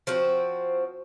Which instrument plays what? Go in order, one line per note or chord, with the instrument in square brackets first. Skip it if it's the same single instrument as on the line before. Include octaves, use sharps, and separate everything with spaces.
[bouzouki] F3 C4 F#4